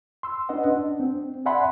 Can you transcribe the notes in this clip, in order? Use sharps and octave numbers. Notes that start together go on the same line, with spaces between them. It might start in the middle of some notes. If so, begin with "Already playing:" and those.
C6 E6
C#4 D4 B4 D#5 F#5
D4
C4
D5 E5 F#5 G#5 B5 C6